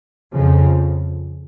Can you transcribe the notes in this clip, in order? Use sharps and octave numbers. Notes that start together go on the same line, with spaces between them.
F2 C#3 F3